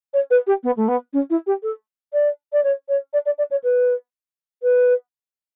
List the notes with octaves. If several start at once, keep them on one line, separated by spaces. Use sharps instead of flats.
C#5
B4
G4
B3
A3
B3
C#4
E4
G4
A4
D5
D5
C#5
C#5
D5
D5
D5
C#5
B4
B4